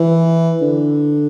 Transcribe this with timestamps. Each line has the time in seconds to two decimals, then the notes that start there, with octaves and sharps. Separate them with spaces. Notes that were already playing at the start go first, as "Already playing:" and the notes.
Already playing: E3
0.61 D3